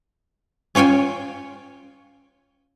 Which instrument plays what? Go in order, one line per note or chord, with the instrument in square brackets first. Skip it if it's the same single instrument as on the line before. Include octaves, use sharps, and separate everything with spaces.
[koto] C#4 F4 C#5 G5 G#5